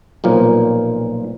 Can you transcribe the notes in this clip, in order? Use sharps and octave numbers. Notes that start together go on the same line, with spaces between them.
B1 A#2 F3 A#3